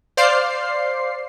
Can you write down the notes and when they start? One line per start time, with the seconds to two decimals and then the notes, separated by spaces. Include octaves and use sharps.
0.17 C5 D5 F5 C7